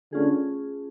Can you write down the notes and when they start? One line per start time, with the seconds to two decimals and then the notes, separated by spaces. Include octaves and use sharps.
0.13 D3 A3 C#4 F4 G#4